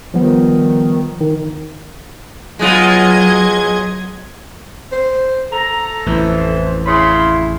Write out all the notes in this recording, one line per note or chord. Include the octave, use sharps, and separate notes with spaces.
D#3 F3 G3 B3
D#3
F#3 G#3 B3 F4 D#5 G#6
C5
A4 A#5
A1 F2 E3 C5
C#3 E4 B5 C6